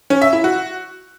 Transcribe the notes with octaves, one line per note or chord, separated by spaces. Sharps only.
C#4
E5
E4
F#4